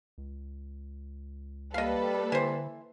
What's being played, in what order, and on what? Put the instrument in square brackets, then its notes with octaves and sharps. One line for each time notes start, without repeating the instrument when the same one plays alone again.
[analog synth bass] C#2
[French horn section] G3 [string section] A#3 A4 B4 [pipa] D#5 F5
[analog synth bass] D3 [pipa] E3 C5